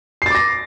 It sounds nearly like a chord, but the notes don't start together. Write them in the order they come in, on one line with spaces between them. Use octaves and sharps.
C7 A6 D6 A#6